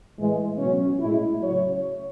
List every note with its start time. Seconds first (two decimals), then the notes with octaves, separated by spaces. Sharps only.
0.18 A2 E3 G#3
0.59 B2 F#3 C#4
1.00 A2 G#3 E4
1.41 C#3 F#3 C#5